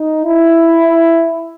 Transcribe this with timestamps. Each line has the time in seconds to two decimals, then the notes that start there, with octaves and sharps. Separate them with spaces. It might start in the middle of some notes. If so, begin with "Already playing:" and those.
Already playing: D#4
0.24 E4